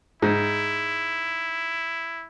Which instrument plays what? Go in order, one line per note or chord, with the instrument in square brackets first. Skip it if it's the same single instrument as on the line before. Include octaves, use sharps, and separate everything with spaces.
[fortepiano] G#2 [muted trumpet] E4